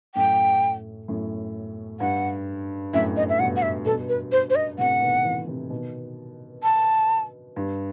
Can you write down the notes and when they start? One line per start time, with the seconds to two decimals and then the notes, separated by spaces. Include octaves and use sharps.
0.15 F#2 A2 G5
1.08 F#2 A2
2.00 G2 F#5
2.93 F#2 A2 E5
3.17 D#5
3.29 E5
3.39 G2 B2 F#5
3.56 F#5
3.62 E5
3.85 G2 B2 A4
4.09 B4
4.32 C5
4.50 C5
4.55 D#5
4.78 A2 C3 F#5
5.01 B2 D#3
5.24 C3 E3
5.48 C3 E3
5.70 B2 D#3
6.63 A5
7.56 G2